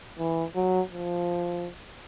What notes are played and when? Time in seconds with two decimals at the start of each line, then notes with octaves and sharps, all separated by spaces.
0.19 E3
0.56 F#3
0.92 F3